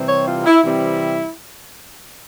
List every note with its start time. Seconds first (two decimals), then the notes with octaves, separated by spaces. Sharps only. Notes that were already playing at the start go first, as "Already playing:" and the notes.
Already playing: C3 E3 G3 C4
0.09 C#5
0.27 F4
0.46 E4
0.64 C3 E3 G3 C4 E4